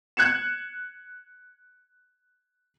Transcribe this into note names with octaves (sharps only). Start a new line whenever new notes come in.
F#6 G#6 C#7 E7